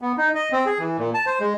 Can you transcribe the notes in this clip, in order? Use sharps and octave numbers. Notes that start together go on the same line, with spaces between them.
B3
D#4
D#5
C4
G#4
E3
A#2
A5
C5
G#3